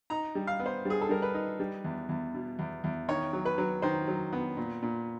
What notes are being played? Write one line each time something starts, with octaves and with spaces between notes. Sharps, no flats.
D#4 A#5
G3
F5
B3
C5
G3 G#4
A4
G3 A#4
B4
D#4
G3
E2
E2
B2
E2
E2
D#3 C#5
F#3
B4
F#3
D#3 C5
F#3
B3
A#2
A#2